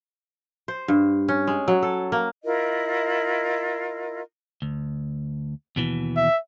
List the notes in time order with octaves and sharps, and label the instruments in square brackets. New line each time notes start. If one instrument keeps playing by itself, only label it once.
[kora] C5
G2
C#4
G#3
F#3
A4
A#3
[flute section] E4 F4 A#4 D#5
[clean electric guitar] D2
D#2 B2 E3
[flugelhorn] E5